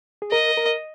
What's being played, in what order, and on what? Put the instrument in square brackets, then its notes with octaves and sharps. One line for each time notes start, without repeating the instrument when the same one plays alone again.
[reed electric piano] G#4
[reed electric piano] A#4 [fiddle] D#5
[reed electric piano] A#4